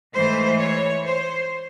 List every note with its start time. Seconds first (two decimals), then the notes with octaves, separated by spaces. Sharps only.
0.14 G#2 E3 A3 C5
0.58 C#5
1.04 C5